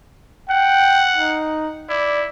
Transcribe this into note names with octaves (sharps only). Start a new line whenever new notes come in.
F#5 G5
D#4
E4 D5